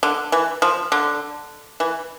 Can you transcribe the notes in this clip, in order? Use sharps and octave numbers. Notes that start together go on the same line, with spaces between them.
D3
E3
F3
D3
E3